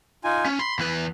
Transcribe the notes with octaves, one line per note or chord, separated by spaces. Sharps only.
D#4 F4 G#5
C#4
B5 C6
E2 B4